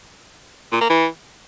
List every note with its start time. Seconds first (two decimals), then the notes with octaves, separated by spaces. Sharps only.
0.72 A#2
0.81 A#3
0.90 E3